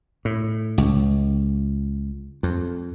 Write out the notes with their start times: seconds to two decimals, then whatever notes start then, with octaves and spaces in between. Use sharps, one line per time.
0.25 A2
0.78 C#2
2.43 F2